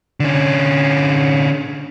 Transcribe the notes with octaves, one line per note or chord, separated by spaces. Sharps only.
D3 C#4